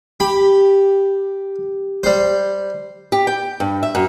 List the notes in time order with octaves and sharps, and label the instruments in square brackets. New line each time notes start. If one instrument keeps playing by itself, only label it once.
[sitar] G4 [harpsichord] B5
[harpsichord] G3 C5
[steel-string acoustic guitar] G4
G5
G2
E5
F#2